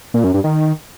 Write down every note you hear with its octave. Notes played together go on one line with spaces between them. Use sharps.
A#2
F#2
G2
D#3